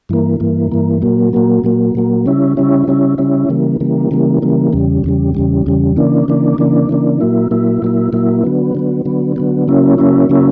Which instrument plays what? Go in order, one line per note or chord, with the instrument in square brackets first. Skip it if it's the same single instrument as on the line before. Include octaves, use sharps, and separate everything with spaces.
[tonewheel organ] G2 E3 A#3
G2 E3 A#3
G2 E3 A#3
A#2 F#3 A#3
A#2 F#3 A#3
A#2 F#3 A#3
A#2 F#3 A#3
C#3 G3 C#4 E4
C#3 G3 C#4 E4
C#3 G3 C#4 E4
C#3 G3 C#4 E4
C#3 E3 G3 A#3
C#3 E3 G3 A#3
C#3 E3 G3 A#3
C#3 E3 G3 A#3
E2 C#3 G3
E2 C#3 G3
E2 C#3 G3
E2 C#3 G3
C#3 E3 A#3 D4
C#3 E3 A#3 D4
C#3 E3 A#3 D4
C#3 E3 A#3 D4
A#2 F#3 A#3 E4
A#2 F#3 A#3 E4
A#2 F#3 A#3 E4
A#2 F#3 A#3 E4
D3 F#3 B3
D3 F#3 B3
D3 F#3 B3
D3 F#3 B3
C#3 F#3 A#3 C#4 E4
C#3 F#3 A#3 C#4 E4
C#3 F#3 A#3 C#4 E4